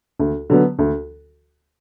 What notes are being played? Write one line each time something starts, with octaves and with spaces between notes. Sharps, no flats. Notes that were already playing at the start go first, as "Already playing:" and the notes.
D2
D3 F#3 B3
D2